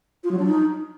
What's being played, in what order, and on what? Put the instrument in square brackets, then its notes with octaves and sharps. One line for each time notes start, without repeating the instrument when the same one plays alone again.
[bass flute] F4
F#3
D4
D#4